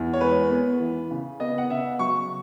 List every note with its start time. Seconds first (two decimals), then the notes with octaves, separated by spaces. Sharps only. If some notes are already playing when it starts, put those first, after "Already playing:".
Already playing: E2
0.13 C#5
0.21 G#3 B4
0.50 B3
0.80 E3
1.11 C#3
1.40 B3 D#5
1.58 F#5
1.70 C#3 E5
1.99 F#3 C#6